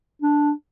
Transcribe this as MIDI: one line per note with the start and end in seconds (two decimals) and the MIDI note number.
0.22 0.51 62